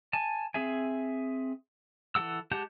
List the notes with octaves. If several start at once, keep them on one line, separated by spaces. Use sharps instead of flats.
G#5 A5
C4 G#4 E5 G#5
E3 G#4 A4 F#5 E6
G#3 G4 F#5 A5 G6